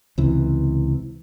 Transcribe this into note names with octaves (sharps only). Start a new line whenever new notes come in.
C#2 C3 E3